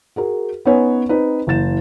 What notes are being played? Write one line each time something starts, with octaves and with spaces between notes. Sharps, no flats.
F#4 G#4 A#4
B3 C#4 D#4 B4 C#5 G#5
C4 D#4 B4
F#1 E3 A6 E7